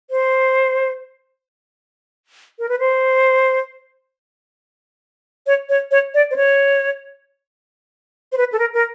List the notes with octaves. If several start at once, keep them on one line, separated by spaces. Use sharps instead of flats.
C5
A#4
B4
C5
C#5
C#5
C#5
D5
C5
C#5
C5
B4
A4
A#4
A#4